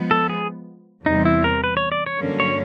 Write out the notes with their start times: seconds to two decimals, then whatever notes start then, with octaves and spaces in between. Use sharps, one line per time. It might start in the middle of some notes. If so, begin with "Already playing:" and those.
Already playing: F3 G#3 B3
0.11 A4
0.29 G#4
1.05 E2 C3 E3 G3 C4 D#4
1.25 E4
1.44 A#4
1.64 B4
1.77 C#5
1.92 D5
2.06 C#5
2.20 G2 D3 F#3 A#3 C#4
2.40 C#5